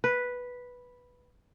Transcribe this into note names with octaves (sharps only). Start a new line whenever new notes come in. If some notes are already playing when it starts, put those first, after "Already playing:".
B4